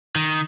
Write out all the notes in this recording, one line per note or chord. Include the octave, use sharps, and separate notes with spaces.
D#3